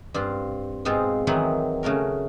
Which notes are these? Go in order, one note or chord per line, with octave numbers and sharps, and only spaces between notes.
G2 C4 F4
G#2 B2 G#3 C4 F4
D#3 E3 F#3 G#3 C4 D#4
C#3 A3 F#4 A#4